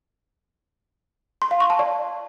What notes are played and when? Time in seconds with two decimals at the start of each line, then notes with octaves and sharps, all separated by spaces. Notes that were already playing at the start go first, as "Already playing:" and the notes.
1.42 C6
1.51 F5
1.60 C#6
1.70 A5
1.79 D5